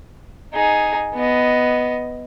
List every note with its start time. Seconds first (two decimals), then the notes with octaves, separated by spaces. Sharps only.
0.53 D#4 G#4
1.14 B3 D#5